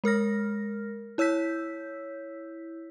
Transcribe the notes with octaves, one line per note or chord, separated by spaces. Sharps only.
G#3 A#4 F6 A#6
E4 C#5 E6 G6 B6